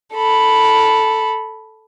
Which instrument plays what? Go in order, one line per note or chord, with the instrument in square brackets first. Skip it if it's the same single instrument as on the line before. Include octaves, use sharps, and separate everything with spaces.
[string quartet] A4 B5